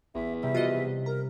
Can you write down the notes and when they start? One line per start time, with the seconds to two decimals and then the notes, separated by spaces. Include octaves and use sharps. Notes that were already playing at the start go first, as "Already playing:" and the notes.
0.15 A1 E2 E5
0.43 C3 G3 E5
0.55 F4 F#4 D#5
1.06 A#4 A#5